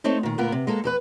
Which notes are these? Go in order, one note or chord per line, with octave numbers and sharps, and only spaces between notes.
A3 C4 D#4 A4 C#5
A#2 D#3
D2 A#2 B3 F4 A#4
C3
G#3 A#3 A4
E2 A4 B4